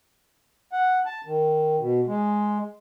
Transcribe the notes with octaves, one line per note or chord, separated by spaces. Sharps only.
F#5
A5
D#3
B2
G#3